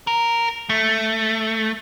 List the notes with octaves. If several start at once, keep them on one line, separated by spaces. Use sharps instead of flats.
A#4
A3